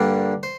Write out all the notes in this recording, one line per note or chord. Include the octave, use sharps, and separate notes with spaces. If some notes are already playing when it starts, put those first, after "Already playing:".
Already playing: G2 D3 G3 A#3
C5